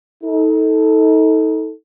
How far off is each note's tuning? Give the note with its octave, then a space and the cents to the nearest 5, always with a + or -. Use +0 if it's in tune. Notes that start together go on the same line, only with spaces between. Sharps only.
D#4 +35 A4 +0